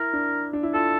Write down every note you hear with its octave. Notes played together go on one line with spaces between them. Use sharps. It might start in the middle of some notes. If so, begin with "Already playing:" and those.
Already playing: E4 A#4
D4
D4
E4
F4 A4